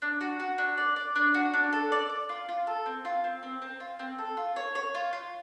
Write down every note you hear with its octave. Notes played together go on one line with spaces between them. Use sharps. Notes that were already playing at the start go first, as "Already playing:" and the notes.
D4
F#4
F#4
D4
D5
D5
D4
F#4
D4
A4
D5
D5
F4
F4
A4
C4
F4
C4
C4
C4
F4
C4
A4
F4
C#5
C#5
F4
F4